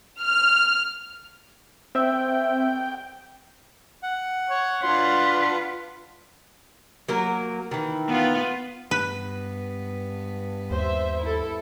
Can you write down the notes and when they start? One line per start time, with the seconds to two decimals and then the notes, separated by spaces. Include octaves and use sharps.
0.22 F6
1.95 C4 E5 G5
4.03 F#5
4.50 C#5
4.83 D4 F4 B4 C6
7.09 F#3 A#3 A#4
7.71 D#3 E3
8.07 B3 F4
8.91 G2 B3 B4
10.71 D#2 C5 E5
11.21 E4 A4